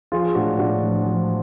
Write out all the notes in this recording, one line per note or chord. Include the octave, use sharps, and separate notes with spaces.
F3 F4 G#4
A2 D4 F#4
A2 D4 F#4
F3
F3